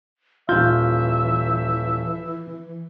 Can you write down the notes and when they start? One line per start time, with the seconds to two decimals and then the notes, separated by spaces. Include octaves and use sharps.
0.49 D#1 E3 F4 E5 G6